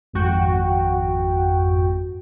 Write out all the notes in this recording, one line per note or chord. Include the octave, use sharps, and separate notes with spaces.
G#1 F2 F#4 G5